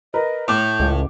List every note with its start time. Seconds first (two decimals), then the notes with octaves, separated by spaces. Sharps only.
0.14 A#4 B4 D#5
0.48 A2 D6 G6
0.80 C#2